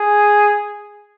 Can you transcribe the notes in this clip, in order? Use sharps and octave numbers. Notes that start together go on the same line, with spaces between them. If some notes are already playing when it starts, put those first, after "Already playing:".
Already playing: G#4